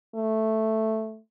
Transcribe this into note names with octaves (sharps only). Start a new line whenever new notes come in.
A3